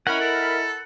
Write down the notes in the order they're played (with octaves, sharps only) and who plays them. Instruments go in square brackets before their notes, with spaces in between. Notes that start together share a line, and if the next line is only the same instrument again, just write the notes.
[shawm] C#4 [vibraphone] E4 D#5 E5 [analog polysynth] A#4 B5 [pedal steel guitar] F#5
[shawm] A4